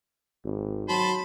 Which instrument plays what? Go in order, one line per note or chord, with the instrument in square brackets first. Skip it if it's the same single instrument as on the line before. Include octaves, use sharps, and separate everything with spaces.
[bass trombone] G#1
[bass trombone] F#3 [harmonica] C5 A5 B5